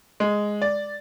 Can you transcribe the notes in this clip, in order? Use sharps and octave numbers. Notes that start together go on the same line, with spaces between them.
G#3
D5